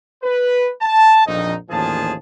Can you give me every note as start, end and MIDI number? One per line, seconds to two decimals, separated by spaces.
0.23 0.71 71
0.82 1.27 81
1.27 1.54 34
1.27 1.54 41
1.27 1.54 63
1.70 2.14 33
1.70 2.14 39
1.70 2.14 46
1.70 2.14 53
1.70 2.14 68
1.70 2.14 81